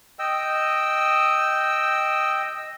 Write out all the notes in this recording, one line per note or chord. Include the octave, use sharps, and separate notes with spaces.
D#5 G5 E6